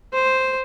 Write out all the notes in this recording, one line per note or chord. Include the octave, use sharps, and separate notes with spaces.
C5